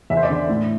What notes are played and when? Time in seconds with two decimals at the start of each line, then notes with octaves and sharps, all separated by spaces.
0.10 E2 E5
0.17 C5
0.23 D5
0.30 D3
0.49 A2